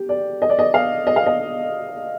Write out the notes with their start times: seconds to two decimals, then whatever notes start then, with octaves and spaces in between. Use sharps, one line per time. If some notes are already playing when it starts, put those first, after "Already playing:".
Already playing: G4
0.09 D5
0.42 D#5
0.50 D5
0.59 D#5
0.74 F5
1.07 D#5
1.16 F5
1.26 D#5